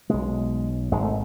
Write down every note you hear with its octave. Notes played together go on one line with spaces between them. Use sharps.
B1 B2 G#3
G#1 G#2 G#3
A3